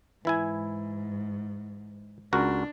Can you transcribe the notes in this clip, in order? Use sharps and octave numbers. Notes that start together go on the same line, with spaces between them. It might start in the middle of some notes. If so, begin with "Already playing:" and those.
G#2 E3 E4 G#5
C#2 D4 F#4 A#4